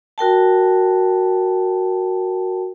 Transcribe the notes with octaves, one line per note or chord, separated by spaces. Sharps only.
F#4 A#4 G5 A5